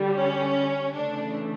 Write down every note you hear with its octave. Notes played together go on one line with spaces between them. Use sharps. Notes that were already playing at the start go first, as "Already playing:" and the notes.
Already playing: D3 G3
C#4
C#3 E3 A3 D4